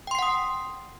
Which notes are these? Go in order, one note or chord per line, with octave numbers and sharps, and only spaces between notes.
F#5 G5 C6 D#6 C7